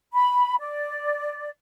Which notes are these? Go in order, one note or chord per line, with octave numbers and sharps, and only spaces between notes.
B5
D5